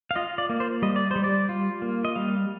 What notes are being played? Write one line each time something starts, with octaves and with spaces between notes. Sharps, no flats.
F5
F4 D#5
D5
A#3
C5
G3 D#5
D5
G3 C5
D5
F4
A#3
D#5
G3 F5